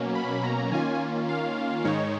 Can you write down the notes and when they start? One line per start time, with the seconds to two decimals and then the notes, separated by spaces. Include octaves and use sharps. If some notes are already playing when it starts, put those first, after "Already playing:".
Already playing: B2 F#3 A#3 C#4
0.15 B5
0.44 A#5
0.72 D#3 A#3 C#4 F4 G#5
1.29 F5
1.84 G#2 D#3 G#3 D#4 C#5